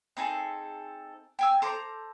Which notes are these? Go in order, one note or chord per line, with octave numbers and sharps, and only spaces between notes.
C4 D#4 G#4 A4
G5 G#5 E6
A4 C5 A#5 D6